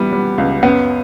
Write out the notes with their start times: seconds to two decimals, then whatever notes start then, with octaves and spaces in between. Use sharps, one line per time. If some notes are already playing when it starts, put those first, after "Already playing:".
Already playing: E3 G3 B3
0.13 G3
0.38 C#2
0.63 F#2 B3